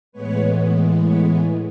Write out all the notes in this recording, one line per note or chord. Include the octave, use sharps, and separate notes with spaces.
A2 E3 G#3 B3 B4 C#5
B4 C#5